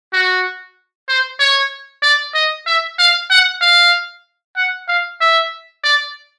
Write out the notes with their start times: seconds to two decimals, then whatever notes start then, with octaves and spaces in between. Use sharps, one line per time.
0.13 F#4
1.08 C5
1.40 C#5
2.03 D5
2.35 D#5
2.67 E5
2.99 F5
3.31 F#5
3.62 F5
4.56 F#5
4.88 F5
5.21 E5
5.84 D5